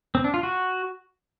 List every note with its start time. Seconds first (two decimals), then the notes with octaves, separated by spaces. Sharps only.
0.15 C4
0.24 D4
0.34 F4
0.43 F#4